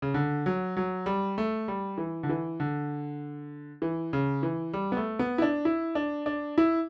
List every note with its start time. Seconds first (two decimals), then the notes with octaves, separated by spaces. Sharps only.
0.02 C#3
0.14 D3
0.46 F#3
0.77 F#3
1.06 G3
1.38 A3
1.68 G3
1.98 E3
2.23 D3
2.29 E3
2.60 D3
3.82 E3
4.13 C#3
4.43 E3
4.73 G3
4.92 B3
4.97 A3
5.19 B3
5.38 E4
5.42 D4
5.65 E4
5.95 D4
6.26 D4
6.58 E4